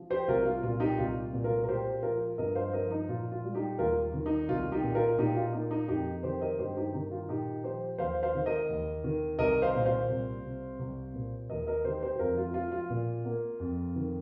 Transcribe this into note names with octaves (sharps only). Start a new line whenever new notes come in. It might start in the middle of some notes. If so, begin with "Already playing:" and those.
Already playing: F3
G4 C5
C2 F4 A#4
F4
A#2 F4
D#4 G4
C2 F4
A#2
F4 A#4
A#4
A#2 G4 C5
F3 F4 A#4
G2 A#4 D#5
C5 F5
F3 A#4 D#5
D#4
A#2 F4
F4
G3
D#4 G4
D#2 F4 A#4
D#3
D#4
C2 F4
D#4 G4
A#2
F4 A#4
A#2 D#4 G4
F4
A#3 D#4
D#4
F2 D#4 G4
D#3 G4 C5
A#4 D#5
G2 G4 C5
D#4 G4
D#3 D#4
F4
A#2 D#4 G4
F3 G4 C5
D#2 C5 F5
C5 F5
D#3
A#4 D#5
D#2
D#3
C2 A#4 D#5
C5 F5
A#2
C5 F5
C2
C3
C2
A#2
D#2 A#4 D#5
A#4 D#5
D#3 G4 C5
G4 C5
G4
F2 F4 A#4
F4
F3 F4
F4
A#2
A#3
F2
D#3